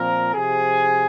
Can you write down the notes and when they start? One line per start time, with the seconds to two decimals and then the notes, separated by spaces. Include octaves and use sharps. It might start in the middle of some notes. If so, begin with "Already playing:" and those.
Already playing: A#2 F3 C4 A#4 A#5
0.34 C3 F3 G#4 G#5